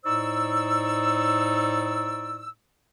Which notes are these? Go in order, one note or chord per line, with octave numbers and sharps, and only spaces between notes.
A2 D#4 C5 D5 C#6 E6